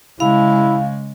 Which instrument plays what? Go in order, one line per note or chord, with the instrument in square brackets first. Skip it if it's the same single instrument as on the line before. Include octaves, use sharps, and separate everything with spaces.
[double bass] C#3 G#3 [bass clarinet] E4 [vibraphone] F5